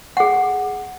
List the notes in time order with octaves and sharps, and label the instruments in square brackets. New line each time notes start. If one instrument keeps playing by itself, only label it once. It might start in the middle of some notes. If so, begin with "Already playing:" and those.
[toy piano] G#4 F#5